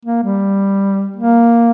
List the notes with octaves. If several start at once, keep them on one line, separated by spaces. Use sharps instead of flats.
A#3
G3
A#3